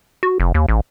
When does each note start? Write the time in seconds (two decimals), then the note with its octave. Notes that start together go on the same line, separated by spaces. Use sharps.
0.23 F#4
0.40 F1
0.54 D#2
0.68 A1